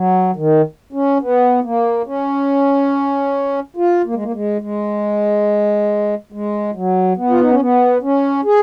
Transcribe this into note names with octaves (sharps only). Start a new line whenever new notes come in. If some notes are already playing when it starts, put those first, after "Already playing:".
Already playing: F#3
D#3
C#4
B3
A#3
C#4
F4
A#3
G#3
A#3
G#3
G#3
G#3
F#3
B3
F4
D#4
C#4
B3
C#4
G#4